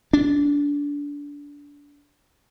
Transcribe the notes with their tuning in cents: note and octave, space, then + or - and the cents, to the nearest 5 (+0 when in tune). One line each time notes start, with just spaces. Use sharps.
D4 -25